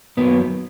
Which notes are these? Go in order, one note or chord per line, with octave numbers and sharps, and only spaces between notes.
F#2 D#3 F#3 A#3 B3